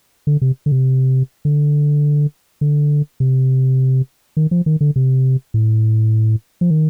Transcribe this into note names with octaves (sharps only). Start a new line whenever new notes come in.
D3
C3
D3
C3
D3
D3
C3
D#3
F3
D#3
D3
C3
A2
F3
D#3